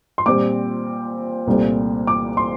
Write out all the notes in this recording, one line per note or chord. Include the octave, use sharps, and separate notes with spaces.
C6
A#2 G3 C4 D6
C2 A#2 A3 C4
D6
C6